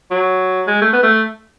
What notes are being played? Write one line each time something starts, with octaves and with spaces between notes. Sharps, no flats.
F#3
G#3
A3
B3
A3